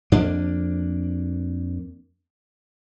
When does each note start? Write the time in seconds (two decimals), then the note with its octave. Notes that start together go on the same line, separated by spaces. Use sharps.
0.12 F2 A#3 D4